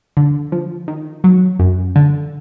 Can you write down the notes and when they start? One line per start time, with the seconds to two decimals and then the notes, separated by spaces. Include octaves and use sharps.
0.17 D3
0.52 F3
0.88 D#3
1.24 F#3
1.59 F#2
1.96 D3